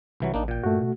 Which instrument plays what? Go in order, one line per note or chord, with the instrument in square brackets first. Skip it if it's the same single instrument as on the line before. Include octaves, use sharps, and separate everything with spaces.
[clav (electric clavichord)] C2 E3 F#3
[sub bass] A1 [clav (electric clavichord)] A#3 D4 D#4
[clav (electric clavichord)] A#2 G5
[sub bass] G2 [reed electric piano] A3 F#4
[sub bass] B2